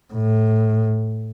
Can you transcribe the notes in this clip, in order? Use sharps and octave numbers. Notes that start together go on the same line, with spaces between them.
A2